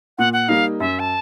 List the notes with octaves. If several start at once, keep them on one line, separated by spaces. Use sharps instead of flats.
A#2 F#5
F#5
G3 A#3 D#4 F5
F#2 E5
A5